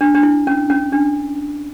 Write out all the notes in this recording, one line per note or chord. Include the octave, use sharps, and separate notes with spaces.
D4
D4
E4
C#4
C#4
D4